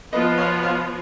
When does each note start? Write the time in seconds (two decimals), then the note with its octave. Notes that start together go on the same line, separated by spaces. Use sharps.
0.13 F3 B3 F4 B4 D#5
0.38 C#5 F5
0.63 C#5 F5